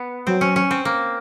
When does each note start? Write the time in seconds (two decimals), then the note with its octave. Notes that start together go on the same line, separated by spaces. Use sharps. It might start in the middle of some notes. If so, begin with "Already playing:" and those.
Already playing: B3
0.27 F#3 C4
0.41 C#4
0.56 C#4
0.71 C4
0.85 A#3